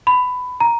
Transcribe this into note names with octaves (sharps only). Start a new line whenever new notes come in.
B5
A#5